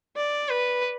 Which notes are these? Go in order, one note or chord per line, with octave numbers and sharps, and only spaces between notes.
D5
B4